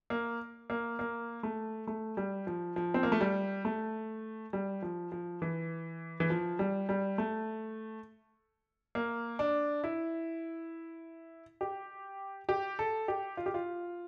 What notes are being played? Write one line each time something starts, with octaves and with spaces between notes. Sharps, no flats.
A#3
A#3
A#3
A3
A3
G3
F3
F3
C4
A#3
A3
G3
A3
G3
F3
F3
E3
E3
F3
G3
G3
A3
A#3
D4
E4
G4
G4
A4
G4
F4
G4
F4